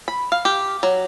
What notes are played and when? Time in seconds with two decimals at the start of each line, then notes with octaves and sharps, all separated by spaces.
0.08 B5
0.32 F5
0.45 G4
0.83 F#3